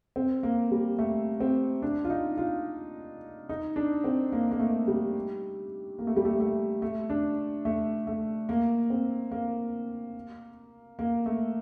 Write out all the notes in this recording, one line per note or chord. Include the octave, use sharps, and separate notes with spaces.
C4
A#3
G3
A3
C4
D4
F4
D#4
F4
D#4
D4
C4
A#3
A#3
A3
G3
A#3
A3
G3
A3
A3
A3
D4
A3
A3
A#3
C4
A#3
A#3
A3